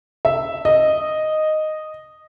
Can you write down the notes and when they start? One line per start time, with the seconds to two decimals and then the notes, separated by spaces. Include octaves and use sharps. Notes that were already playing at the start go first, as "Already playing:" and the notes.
0.25 E5
0.65 D#5